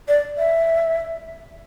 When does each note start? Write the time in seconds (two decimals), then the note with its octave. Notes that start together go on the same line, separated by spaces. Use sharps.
0.08 D5
0.38 E5